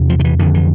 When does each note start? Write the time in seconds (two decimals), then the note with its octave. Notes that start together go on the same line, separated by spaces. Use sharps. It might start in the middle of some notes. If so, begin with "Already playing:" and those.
Already playing: E2 C3
0.09 F3
0.20 D#3
0.25 E3
0.39 F2 D3 D#3
0.54 E3